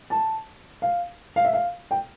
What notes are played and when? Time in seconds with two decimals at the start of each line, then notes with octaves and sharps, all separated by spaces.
0.10 A5
0.82 F5
1.36 F5
1.45 E5
1.53 F5
1.91 G5